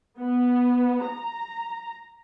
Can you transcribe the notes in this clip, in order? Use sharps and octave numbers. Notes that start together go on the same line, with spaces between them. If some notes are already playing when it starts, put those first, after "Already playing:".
B3
A#5